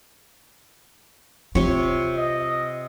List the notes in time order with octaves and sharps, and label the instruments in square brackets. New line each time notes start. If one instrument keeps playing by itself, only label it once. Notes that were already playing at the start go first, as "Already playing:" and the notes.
[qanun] C3 C#5 [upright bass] F4
[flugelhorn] D#5